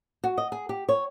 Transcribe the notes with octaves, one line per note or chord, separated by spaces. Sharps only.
F#4
D#5
G#4
G4
C#5